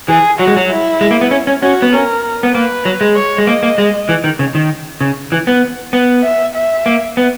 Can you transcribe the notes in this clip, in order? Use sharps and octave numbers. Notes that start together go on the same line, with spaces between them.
E3 G#4
F#3 F#4
G#3
F#3
E4
G#3
A#3
B3
C#4
C#4
C#4 F#4
B3
C#4 A#4
B3
A#3 B4
F#3
G#3
C#5
G#3
A#3 D#5
A#3
G#3
E3
D#3
C#3
D#3
C#3
E3
B3
B3
E5
E5
A#3
B3